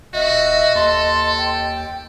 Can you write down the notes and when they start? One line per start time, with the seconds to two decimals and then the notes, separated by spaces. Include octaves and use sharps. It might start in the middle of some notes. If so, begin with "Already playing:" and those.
0.14 D#1 F#4 D#5 E5
0.75 D#2 A4 C6
1.38 G5